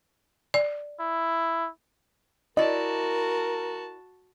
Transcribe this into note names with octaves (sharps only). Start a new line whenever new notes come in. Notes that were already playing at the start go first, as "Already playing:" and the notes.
D5
E4
E4 F#4 A#4 D5 D#5 A5